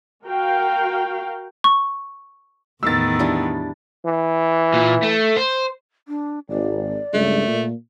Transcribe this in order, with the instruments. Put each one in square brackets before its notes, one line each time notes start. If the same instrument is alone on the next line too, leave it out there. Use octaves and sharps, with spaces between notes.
[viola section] F#4 A#4 F5 G5
[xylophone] C#6
[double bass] E2 A2 [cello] D#3 B3 [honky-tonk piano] E6 A6
[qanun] G3 D4 E4
[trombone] E3
[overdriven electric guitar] A#2
A3
C5
[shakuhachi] D4
[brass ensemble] G#1 [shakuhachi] D5
[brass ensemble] C#2 G2 G#3 [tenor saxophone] A3
[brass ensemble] A#2